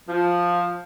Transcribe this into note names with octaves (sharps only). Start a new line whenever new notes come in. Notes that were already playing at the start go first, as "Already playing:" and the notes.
F3